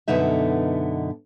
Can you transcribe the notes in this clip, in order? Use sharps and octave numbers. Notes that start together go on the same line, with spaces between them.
F#2 B2 D3 B3 D#4 E5